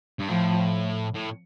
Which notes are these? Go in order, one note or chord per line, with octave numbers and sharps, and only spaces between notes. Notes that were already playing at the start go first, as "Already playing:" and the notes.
G2
A2 F3
A2